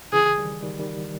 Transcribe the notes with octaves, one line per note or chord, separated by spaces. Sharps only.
C#3 E3 G#4
D#3 G3
D#3 G3
D#3 G3